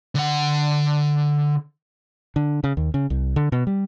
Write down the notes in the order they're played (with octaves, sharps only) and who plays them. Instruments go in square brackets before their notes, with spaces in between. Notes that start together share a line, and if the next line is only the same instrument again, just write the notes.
[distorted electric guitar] D3 F#5
[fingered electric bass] D3
C#3
D#2
C#3
C2
D3
B2
G3